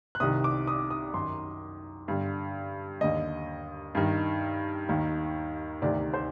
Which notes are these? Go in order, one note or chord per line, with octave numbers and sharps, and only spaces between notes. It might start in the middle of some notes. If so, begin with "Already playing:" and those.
F#6
C2 C3 D#3 D#6
D6
D#6
D#6
F#2 D#3 C6
G2 D3
D#2 D3 D#5
G2 D#3
D#2 D#3
D2 C3 D#3 D5
C5